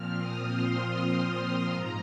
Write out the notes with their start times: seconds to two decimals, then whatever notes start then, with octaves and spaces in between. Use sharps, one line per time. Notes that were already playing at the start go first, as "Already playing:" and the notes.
Already playing: A#2 F3 C4 F6
0.18 D#6
0.49 C6
1.71 G#2 F3 A#5